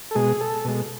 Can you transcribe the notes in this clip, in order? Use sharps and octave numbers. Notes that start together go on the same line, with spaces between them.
A4
B2 G#3 G#4
A4
B2 G#3